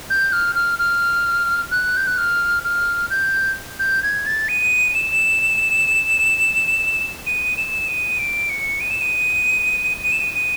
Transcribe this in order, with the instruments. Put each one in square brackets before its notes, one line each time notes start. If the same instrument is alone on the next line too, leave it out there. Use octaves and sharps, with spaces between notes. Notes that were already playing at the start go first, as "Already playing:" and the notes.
[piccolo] G6
F6
F6
F6
F#6
G6
F#6
F6
F6
G6
G6
G#6
A6
D#7
E7
D#7
E7
D#7
D7
C#7
D#7
E7
D#7
D#7
E7
D#7
D#7